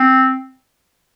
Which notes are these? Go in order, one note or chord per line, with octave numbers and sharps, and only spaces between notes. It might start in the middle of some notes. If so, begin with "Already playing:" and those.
Already playing: C4